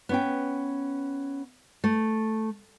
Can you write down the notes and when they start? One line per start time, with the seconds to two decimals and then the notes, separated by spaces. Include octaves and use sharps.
0.09 B3 C#4 G5
1.84 A3